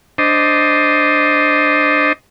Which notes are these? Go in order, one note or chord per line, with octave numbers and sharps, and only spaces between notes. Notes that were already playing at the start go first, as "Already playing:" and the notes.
D4 C5 D#5